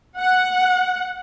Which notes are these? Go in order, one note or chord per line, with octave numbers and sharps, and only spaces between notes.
F#5